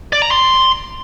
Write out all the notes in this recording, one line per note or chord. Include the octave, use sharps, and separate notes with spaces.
D5
A#5
C6